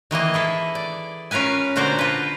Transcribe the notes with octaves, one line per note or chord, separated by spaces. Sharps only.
D#3 E3 A#3 D#5
E4 G#4 A4
D5
C#4 F4 A#4 B4 G#5
A#2 D3 F#4 C5 D5 A#5
F4 B4